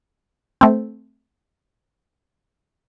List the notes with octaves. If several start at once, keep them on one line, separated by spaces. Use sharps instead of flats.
A3 C4